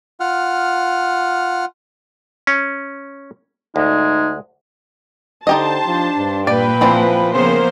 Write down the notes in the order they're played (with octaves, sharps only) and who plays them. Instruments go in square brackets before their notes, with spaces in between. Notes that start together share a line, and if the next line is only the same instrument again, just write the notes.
[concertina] F4 F#5 F6
[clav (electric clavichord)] C#4
[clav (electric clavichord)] D2 [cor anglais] G#3 [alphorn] D#4
[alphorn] D3 [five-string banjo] D#4 G4 D#5 [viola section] C5 A5
[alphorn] F3 [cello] D4
[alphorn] G2
[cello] A#2 G5 [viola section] B4 [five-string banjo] D5
[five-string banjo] E3 C4 D4 [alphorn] F3
[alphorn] C#3 [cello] F3 B3 [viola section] A#3 C5